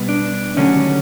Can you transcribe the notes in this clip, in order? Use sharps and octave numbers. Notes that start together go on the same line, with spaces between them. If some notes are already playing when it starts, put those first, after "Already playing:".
Already playing: B2 G3 B3
D4
D#2 D3 F#3 A3 C#4